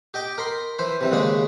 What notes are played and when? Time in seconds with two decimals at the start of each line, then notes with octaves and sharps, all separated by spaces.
0.14 G4 D#5 G5 D6
0.38 A#4 B5 C6
0.79 E3 C5 B5
1.01 C3 E3 G3
1.12 D#2 C#3 G#3 G#4 B5